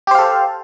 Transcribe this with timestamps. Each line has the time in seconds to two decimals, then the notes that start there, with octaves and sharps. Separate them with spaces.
0.07 G4
0.11 C5
0.15 F5
0.19 A4